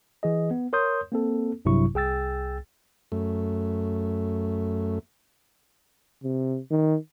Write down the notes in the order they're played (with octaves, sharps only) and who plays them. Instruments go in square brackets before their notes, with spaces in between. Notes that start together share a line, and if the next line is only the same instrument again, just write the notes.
[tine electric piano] E3 G#4 D#5
B3
A#4 C#5 C6 D#6 G6
A#3 C4 A4
A#1 G2 C3 F#3 E4 C#6
C2 G#4 G5 E6 A6
[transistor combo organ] F#2 A3
[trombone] C3
D#3